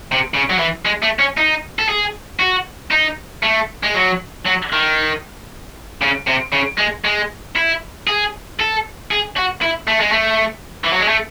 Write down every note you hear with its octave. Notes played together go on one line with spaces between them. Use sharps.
C3
C#3
F#3
E3
G#3
A3
C#4
D#4
A4
G#4
F#4
D#4
A3
G#3
F#3
F#3
D#3
C#3
C3
C#3
G#3
G#3
E4
G#4
A4
G#4
F#4
E4
A3
G#3
A3
E3
F#3
G#3
A3